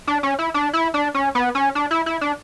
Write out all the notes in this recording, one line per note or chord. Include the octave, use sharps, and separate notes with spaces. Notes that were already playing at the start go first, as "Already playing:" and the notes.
D4
C#4
E4
D4
E4
D4
C#4
B3
C#4
D4
E4
E4
D4